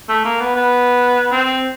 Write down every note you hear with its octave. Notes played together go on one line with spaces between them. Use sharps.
A3
A#3
B3
B3
C4